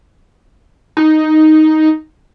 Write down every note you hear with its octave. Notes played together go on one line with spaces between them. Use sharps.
D#4